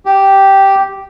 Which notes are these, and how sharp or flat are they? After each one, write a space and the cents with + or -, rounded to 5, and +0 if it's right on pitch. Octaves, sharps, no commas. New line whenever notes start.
G4 -5